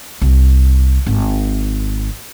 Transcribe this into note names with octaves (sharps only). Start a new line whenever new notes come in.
C2
G#1